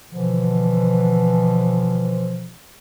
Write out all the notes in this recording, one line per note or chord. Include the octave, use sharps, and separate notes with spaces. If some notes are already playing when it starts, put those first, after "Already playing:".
B2 D3 E3 F3